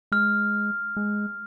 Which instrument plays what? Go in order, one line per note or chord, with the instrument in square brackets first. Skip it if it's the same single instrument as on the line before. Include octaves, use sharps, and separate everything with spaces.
[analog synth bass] G#3 [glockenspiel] F6
[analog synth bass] G#3